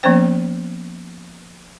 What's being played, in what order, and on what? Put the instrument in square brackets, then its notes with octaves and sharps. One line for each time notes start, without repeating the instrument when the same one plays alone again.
[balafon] F3 A#3 B3 C#4 C5 G5